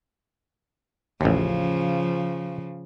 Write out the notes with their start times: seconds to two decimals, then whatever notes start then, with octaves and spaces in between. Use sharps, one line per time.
1.21 A1 D#2 C#3 F3